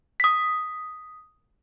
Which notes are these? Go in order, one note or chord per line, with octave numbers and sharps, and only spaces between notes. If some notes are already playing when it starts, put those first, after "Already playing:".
D#6 B6